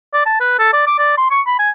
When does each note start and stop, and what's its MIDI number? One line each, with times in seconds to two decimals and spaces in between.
0.14 0.24 74
0.26 0.40 81
0.41 0.56 71
0.59 0.71 69
0.73 0.84 74
0.87 0.97 86
0.99 1.17 74
1.18 1.27 84
1.31 1.41 85
1.47 1.56 83
1.59 1.70 80